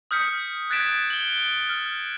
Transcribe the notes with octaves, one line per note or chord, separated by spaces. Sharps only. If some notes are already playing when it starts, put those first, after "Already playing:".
D#6 F6 G6 B6 C#7
F#6 G#6 A6 B6 D7 E7
F#7 G7
F6